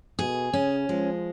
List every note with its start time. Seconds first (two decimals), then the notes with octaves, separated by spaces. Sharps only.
0.19 B2 G#4
0.53 C#3 C#4
0.89 F3 G#3